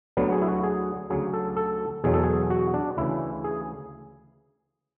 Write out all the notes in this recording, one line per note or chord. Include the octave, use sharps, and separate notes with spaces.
D2 D3 F#3 B3
G#4
E4
F#4
G#4
D2 C#3 F#3 G#4
A4
A4
E2 B2 F#3 G#4
A4
G#4
F#4
D4
D2 C#3 E3 E4
G#4